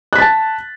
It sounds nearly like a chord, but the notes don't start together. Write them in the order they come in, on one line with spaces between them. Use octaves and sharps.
F#6 B6 A6 A5